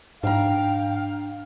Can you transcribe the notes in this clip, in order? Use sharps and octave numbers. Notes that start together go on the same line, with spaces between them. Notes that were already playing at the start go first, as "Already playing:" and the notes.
G#2 D4 F5 G5 A#5